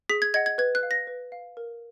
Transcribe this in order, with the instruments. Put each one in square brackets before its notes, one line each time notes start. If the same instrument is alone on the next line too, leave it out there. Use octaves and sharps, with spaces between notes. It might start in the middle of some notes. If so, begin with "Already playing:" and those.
[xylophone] G#4 B6
G#6
D#5 F#5 G#6
G#6
B4 G#6
F#6
F5
A#6
B4
F5
A#4